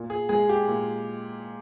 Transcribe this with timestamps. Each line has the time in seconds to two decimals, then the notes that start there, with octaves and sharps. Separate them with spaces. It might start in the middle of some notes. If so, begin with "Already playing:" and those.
Already playing: A#2
0.10 G#4
0.29 G#3 G#4
0.49 G4
0.68 A#2